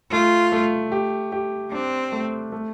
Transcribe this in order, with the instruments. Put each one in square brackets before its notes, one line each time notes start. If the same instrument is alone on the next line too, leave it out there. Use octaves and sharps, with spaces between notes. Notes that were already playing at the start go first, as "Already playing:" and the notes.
[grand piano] A3 [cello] F4
[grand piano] A3
G4
G4
[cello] C4 [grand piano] D4
[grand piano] A3
A3